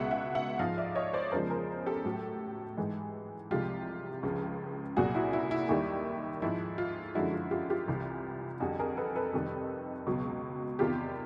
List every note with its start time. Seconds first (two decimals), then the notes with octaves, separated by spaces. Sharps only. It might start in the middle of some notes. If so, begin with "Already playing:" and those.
Already playing: C#2 B2 G#3 E5 F#5
0.11 E5 F#5
0.35 E5 F#5
0.59 G#2 F3 G#3 D#5 F5
0.78 D5 E5
0.95 C#5 D#5
1.13 C5 D5
1.32 E2 C#3 F3 G#3 A#4 C5
1.50 G#4 A#4
1.86 G4 A4
2.05 A2 F#3
2.77 G#2 E3 G#3
3.51 C2 C3 F3 G#3 F4 G4
4.23 C#2 C#3 F3
4.96 C2 A#2 F#3 F#4 G#4
5.15 E4 F#4
5.32 E4 F#4
5.51 E4
5.69 D#2 D#3 G3 E4
6.42 G#2 F3 G#3 E4
6.78 F4
7.15 F#2 D3 F3 G#3 E4 F#4
7.33 F4
7.51 F4 G4
7.70 F4 G4
7.88 C2 C3 E3
8.60 F2 D3 G3 F#4 G#4
8.79 G#4 A#4
8.97 A4 B4
9.15 A4 B4
9.33 F2 C3 D#3 G3
10.07 C#2 B2 F#3
10.79 E2 C3 D#3 F4 G4